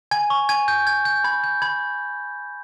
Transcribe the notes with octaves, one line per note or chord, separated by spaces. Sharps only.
G#5 G#6
C#6
G#5 G#6
G6
G6 G#6
G6
B5 G#6
G6
B5 G#6